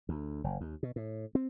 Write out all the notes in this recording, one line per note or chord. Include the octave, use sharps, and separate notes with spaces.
D2
F#1
D#2
B2
A2
C4